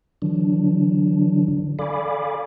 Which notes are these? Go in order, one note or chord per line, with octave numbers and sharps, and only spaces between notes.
D3 E3 F#3 D4
A4 D5 F5 G#5 B5 D6